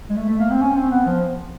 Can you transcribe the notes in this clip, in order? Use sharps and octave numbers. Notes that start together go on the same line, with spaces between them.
G#3
A3
A3
A#3
C4
C#4
C4
B3
F3